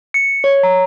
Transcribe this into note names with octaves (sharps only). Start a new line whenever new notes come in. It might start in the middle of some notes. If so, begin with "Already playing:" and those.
C#7
C#5
A#5